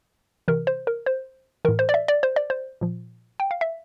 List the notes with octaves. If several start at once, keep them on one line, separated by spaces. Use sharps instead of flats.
C3 E3 A#4
C5
A#4
C5
A2 E3 A#4
C5
D5
E5
D5
C5
D5
C5
A#2 F3
G5
F5
E5